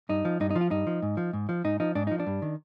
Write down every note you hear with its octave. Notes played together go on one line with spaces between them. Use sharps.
G2 D#4
F3
G2 D#4
D#4
F3
F4
G2 D#4
F3
G#2
F3
G#2
F3
G#2 D#4
F3 D#4
G#2 D4
F3 D#4
D4
G2
D#3